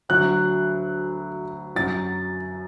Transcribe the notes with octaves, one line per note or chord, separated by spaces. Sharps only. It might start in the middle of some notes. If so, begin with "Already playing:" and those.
D2 D3 F#3 F#6
F#2 F#3 A6